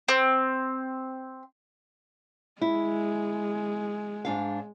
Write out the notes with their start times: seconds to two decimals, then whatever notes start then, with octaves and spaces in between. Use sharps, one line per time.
0.08 C4
2.61 G#3 E4
4.25 G#2 D4 F5